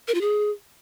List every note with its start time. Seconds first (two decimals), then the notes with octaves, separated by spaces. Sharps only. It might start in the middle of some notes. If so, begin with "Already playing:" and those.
0.08 A#4
0.14 F4
0.21 G#4